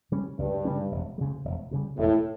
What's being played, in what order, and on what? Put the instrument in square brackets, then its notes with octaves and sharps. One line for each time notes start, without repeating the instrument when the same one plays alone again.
[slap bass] C#3 G3 C#4
[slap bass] C#2 [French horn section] G2
[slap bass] C#3 G3 C#4
E1
G3
D2 C#3
E1
D2 C#3 G3
[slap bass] E1 [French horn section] A2